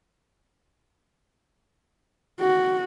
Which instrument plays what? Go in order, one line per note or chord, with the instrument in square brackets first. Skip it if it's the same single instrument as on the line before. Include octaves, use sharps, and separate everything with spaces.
[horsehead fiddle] F#4